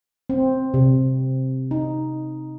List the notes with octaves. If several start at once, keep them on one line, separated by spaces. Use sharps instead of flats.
C4
C3
D#4